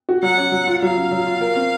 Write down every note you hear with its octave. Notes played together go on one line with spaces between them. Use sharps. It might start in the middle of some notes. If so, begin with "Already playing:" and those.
F#4
F#3 F#5
C#4
F#3
F4
F#3 F5
C#4
F#3
F4
A#4
C4